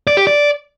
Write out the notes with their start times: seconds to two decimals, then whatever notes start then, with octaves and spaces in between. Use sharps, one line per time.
0.07 D5
0.17 G4
0.27 D5